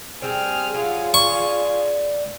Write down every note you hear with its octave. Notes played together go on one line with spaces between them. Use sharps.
G3 C4 G#4 F6
F#3 F4 G#4
D4 C#6